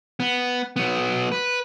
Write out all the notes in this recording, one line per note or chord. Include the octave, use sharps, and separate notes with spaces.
B3
F#3 B3
B4